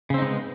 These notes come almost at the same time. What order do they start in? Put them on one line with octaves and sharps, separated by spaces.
C#3 C4 D#4 G#3 B3